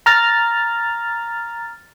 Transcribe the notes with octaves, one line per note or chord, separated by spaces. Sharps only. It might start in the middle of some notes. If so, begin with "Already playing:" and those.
A#5 F6 A6